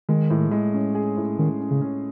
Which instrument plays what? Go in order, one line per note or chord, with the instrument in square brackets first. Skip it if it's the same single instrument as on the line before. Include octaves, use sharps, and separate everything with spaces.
[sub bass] D#3 [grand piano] G#3
[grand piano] A2
G#3
C#4
G#4
A2
[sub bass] D#3 [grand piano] C#4
[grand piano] C#4
[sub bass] C#3
[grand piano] C#4